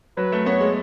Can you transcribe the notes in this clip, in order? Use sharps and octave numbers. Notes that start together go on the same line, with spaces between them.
F#3 B4
A3
B3 C#5
G#3